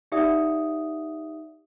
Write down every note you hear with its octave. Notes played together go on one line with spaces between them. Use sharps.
D#4 G4 D5 E5 F#5 D#6